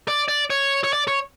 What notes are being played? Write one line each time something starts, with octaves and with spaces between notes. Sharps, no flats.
D5
D5
C#5
C#5
D5
C#5